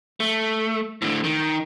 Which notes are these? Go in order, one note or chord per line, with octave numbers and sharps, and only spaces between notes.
A3
A2 D3
D#3